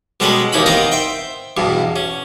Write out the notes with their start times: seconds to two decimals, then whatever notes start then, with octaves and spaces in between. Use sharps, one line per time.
0.20 B2 G3 G#3 C#4 A4 B4
0.53 D#2 E3 C#4 D#4 B5
0.66 B3 C4 D#4 A#4 F5 A#5
0.92 C5 E5 G5
1.57 E2 G2 B2
1.96 C#4